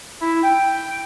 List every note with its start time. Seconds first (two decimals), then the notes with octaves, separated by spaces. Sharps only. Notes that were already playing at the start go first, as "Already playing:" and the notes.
0.19 E4
0.43 G5